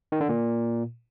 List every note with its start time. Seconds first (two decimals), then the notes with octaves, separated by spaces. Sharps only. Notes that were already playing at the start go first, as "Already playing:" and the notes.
0.12 D#3
0.21 D3
0.29 A#2